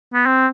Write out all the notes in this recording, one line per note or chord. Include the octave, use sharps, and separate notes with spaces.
B3
C4